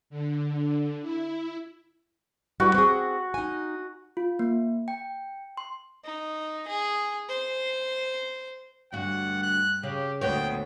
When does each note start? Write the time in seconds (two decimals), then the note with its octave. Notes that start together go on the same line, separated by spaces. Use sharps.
0.10 D3
1.02 E4
2.60 G3 E4 F#4 B4
2.74 C4 G#4
3.34 D#4 G#5
4.17 F4
4.39 A#3
4.88 G5
5.57 C6
6.05 D#4
6.68 G#4
7.29 C5
8.92 D2 G2 F#4 F#5
9.43 F#6
9.83 C#3 G4
10.21 D2 A#2 B3 F#4 C#5 G5